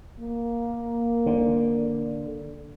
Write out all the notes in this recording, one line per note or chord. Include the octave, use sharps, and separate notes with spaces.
A#3
D3